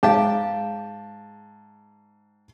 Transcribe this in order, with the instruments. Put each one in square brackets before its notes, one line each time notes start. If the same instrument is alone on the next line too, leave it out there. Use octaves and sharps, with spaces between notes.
[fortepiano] G#2 G5 A5 [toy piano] G#4 F5